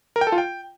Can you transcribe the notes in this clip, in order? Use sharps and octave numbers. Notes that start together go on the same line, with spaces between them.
A#4
G5
A4
F4
G5